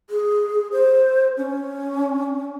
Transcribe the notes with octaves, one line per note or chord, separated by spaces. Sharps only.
G#4
C5
C#4